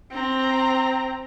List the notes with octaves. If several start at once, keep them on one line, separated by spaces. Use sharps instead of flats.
C4 A#5